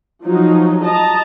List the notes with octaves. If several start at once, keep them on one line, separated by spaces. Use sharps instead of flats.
F3 F#3 D#4
D#5 A5 A#5